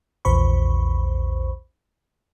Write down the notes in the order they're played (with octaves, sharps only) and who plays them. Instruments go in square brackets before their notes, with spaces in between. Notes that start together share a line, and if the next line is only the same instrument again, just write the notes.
[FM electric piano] A#1 E2 C5 B5 C#6